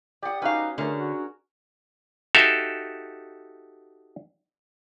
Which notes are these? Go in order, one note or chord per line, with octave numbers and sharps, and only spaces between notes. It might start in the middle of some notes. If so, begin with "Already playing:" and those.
G4 D5 F#5 D#6
C#4 D#4 F#4 B4 F5
D3 A3 G#4 A#4 C#5
F#4
D#4 F#4 G4 A4 E5 F5